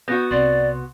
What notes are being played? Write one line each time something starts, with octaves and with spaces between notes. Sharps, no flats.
B3 F#4 G6 A#6
C2 C3 D5 C6